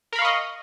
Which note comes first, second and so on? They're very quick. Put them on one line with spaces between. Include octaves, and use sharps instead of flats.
A#4 B5 F5 C#6 D#5